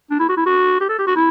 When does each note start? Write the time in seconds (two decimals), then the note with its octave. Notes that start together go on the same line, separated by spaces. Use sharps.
0.11 D4
0.19 E4
0.29 F#4
0.37 E4
0.46 F#4
0.81 G4
0.89 A4
0.99 G4
1.07 F#4
1.16 E4